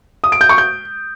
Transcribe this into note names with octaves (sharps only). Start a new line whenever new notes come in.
D#6
D7
G6
C#6
G6